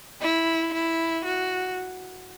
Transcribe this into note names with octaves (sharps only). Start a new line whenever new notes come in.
E4
E4
F#4